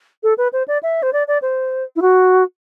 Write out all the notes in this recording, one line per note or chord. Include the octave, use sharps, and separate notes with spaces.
A4
B4
C5
D5
E5
C5
D5
D5
C5
E4
F#4